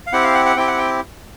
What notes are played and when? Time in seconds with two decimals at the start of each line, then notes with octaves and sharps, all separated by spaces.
0.07 F5
0.12 C4 E4 G4 F#5
0.23 F5
0.35 F#5
0.46 F#5
0.56 C4 E4 G4 G5
0.67 F#5
0.78 G5